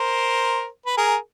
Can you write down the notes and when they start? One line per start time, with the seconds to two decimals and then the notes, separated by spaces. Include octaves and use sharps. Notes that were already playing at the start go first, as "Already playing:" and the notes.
Already playing: A#4 C5
0.86 B4
0.97 G#4 A#4